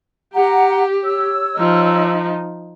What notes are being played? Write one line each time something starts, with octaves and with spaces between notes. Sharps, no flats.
G4 F#5 A#5
C#5 E6
F3 D#4